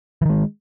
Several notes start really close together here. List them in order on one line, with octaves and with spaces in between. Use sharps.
E3 D#3 G#3